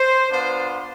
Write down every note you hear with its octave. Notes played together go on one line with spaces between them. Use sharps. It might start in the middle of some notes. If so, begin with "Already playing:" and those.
Already playing: C5
B3 D4 F4 C5